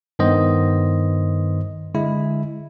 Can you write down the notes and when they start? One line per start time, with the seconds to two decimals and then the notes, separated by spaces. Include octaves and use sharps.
0.19 G2 D#3 B3 C5 D#5
1.94 D3 G#3 E4